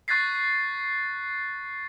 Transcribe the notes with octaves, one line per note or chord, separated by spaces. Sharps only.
C#6 F#6 G#6 A6 B6 C7